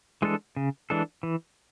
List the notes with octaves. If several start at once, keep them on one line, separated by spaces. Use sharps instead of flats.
E3 G#3 D4 A4
C#3
E3 G#3 D4 A4
E3